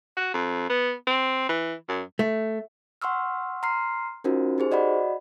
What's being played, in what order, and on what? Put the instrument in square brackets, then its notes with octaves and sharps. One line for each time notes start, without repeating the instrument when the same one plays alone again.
[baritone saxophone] F#4
F2
B3
C4
E3
F#2
[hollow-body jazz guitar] A3
[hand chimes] F#5 C6 C#6 E6 F6
A#5 C6 F6 C7
C#4 D#4 F4 F#4 A#4 C5
D#4 G4 G#4 C5
F#4 D5 D#5 F#5 B5